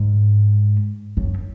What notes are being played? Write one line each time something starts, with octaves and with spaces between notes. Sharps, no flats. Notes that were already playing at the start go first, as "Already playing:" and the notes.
Already playing: G#2
F#2